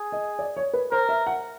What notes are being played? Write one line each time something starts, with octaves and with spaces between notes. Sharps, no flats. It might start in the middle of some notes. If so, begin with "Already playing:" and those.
Already playing: G#4
D#5
D5
C#5
B4
A#4 C5
E5
F#5